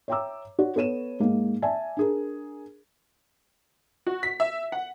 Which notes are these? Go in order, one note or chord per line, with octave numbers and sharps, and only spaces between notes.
C#5 E5 G5 A#5 D6 E6
F#4 C#5 D5
B3 A4 C#5 D#7 E7
G#2 G#3 A#3
D5 E5 G#5 A5
D4 G#4 A#4
F#4
B6
E5
F#5